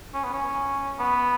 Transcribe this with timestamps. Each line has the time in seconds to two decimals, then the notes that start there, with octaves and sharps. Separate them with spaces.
0.14 C#4
0.24 B3
0.33 C#4
1.00 B3